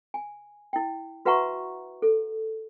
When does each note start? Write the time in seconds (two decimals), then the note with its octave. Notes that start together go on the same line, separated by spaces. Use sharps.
0.14 G#5
0.73 E4 G5
1.25 F#4 B4 E5 F#5 A#5 C#6
2.02 A4